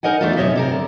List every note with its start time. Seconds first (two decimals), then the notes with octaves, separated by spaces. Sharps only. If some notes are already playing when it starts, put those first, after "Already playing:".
0.03 D#4 A#4 D#5 F#5 G#5
0.21 E2 G#2 E3 A3 D#4 F4
0.36 F#2 C3 B3 C#5 D#5 E5
0.56 C3 A4 A#4
0.71 D3